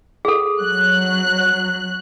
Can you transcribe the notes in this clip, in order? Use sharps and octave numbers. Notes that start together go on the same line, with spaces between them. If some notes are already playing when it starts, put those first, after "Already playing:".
G#4 A4
F#3 F#6